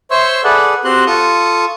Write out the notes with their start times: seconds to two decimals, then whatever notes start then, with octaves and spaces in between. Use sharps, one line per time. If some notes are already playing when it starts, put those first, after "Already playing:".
0.11 C5 C#5 E5 C6 C#6 E6
0.44 G#4 A4 B4 D5 F#5
0.85 C4 F#4 G4 C6 F#6
1.07 F4 A4 C#6 D#6